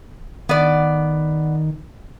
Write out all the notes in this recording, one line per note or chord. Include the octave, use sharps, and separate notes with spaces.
D#3 B3 D5